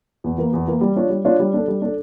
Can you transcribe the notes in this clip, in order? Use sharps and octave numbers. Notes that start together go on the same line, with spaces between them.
E2
E3 A#3
E2
E3 A#3
G3
D4 F4 C#5
G3
D4 F4 C#5
G3
D4 A4
G3
D4 A4